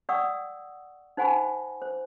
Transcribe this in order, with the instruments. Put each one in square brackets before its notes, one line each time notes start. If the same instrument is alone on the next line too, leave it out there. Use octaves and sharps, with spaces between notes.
[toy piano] D5 F#5 G5 C#6 D#6 E6
D#4 C5 F#5 G#5 B5 C#6
C5